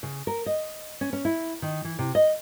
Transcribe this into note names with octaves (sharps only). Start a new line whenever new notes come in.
C#3
A#4
D#5
C#4
C#4
E4
D#3
E3
C3
D#5